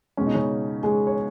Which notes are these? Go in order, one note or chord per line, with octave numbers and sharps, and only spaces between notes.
B2 G#3 C#4
D#4
C#3 C#4
G#3 G#4
C#5